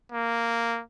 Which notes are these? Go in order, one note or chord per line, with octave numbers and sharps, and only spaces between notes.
A#3